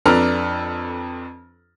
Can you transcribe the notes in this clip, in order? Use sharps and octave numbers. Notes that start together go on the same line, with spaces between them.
F2 D4 A4 B4 A#5 F6